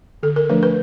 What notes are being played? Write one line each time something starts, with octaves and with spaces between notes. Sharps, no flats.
D3 A4
A#4
F3 A3 D4 B4
B4